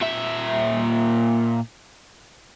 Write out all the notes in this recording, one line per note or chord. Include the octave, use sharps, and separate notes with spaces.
A#2 E5